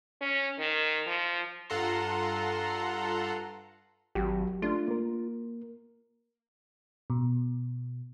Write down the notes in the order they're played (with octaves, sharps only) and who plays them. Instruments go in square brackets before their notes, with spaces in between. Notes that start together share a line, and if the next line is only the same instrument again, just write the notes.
[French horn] C#4
D#3
F3
[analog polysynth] G2 F4 A4 F#5 A#5 C6
[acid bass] G#1 [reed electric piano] F#3 F#4 G4
[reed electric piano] A3 D4 [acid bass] F4
[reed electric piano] A#3 A#4
[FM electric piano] B2